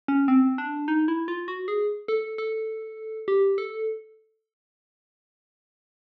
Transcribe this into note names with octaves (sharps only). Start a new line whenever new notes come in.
C#4
C4
D4
D#4
E4
F4
F#4
G#4
A4
A4
G4
A4